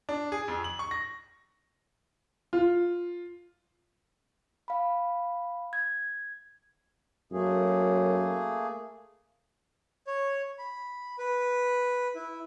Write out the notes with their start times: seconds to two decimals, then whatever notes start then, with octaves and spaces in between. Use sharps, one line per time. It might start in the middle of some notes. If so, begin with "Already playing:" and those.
0.09 D4
0.32 G#4
0.48 F2
0.64 F#7
0.79 C#6
0.91 A#6
2.53 F4
4.68 F5 B5
5.73 G#6
7.32 F#2 A3 A#3 G#4
10.07 C#5
10.58 B5
11.18 B4
12.15 E4